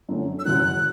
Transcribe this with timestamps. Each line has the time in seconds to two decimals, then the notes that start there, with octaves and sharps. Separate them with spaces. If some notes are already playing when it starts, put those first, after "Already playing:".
0.09 F#2 D3 A3 C#4
0.39 E6
0.45 F#1 E2 B2 F#3 C#4 F#6